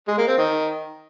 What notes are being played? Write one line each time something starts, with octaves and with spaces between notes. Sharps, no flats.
G#3
A#3
C4
D#3